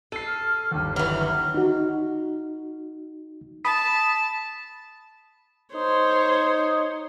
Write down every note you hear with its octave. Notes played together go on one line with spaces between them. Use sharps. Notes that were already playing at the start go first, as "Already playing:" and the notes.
A4 C7 D#7
F6
G1 D#2
E3 F#3 F6
D#4 F#4
A5 B5 D#6 B6
D#4 C5 C#5